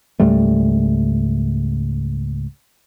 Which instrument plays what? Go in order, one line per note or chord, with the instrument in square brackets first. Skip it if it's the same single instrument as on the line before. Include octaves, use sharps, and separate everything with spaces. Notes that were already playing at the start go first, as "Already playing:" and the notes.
[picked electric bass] C#2 G#2 G3 A3